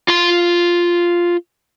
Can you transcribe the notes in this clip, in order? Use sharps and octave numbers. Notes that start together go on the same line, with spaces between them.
F4 C6